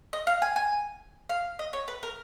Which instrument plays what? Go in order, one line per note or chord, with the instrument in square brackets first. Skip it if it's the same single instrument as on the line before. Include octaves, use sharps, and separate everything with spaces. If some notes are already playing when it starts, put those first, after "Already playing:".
[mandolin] D#5
F5
G#5
G#5
F5
D#5
C#5
B4
A#4